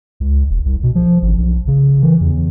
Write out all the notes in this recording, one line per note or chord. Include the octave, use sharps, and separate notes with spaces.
C#2
E1
C2
B2
F3
G#1
B1
C#3
E3
E2